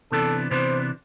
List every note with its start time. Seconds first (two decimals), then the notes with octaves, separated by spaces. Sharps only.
0.12 C3 E3 B3 D4 A4
0.51 C3 E3 B3 D4 C5